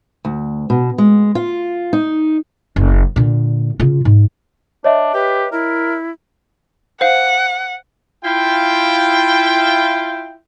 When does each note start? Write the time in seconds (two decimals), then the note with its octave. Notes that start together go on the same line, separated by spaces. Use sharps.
0.25 D2
0.70 B2
0.98 G#3
1.35 F4
1.93 D#4
2.76 F#1
3.16 A#2 D3
3.80 C#3 F4
4.05 G#2
4.84 D4 C#5 D#5 E5
5.14 G4 B4
5.52 E4 A#4
7.01 C5 F5 F#5
8.24 E4 F4 G5